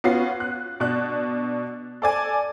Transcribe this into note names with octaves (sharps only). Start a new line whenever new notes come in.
B3 C#4 F4 F#4 C7
F#6
B2 D4 F#6
A4 D5 G#5